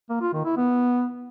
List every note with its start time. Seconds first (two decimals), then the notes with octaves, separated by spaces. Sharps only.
0.09 A#3
0.21 F4
0.33 D#3
0.45 E4
0.57 B3